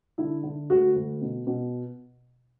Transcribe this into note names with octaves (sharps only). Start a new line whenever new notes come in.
D3 E4
D3
D2 F#4
D2
B2
B2